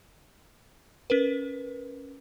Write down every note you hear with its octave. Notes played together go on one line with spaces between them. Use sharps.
C#4 A#4 B4